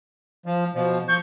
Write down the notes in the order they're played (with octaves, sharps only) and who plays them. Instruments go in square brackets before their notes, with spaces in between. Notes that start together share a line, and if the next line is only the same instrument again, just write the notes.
[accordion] F3
B2 F3
[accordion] F3 C#6 [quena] G6